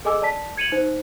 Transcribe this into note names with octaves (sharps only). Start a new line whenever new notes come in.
G#4 A4 D#5 G#5 D6 E6
D5 A5 B6
G#6 C#7 D#7 F7 F#7
D#4 C5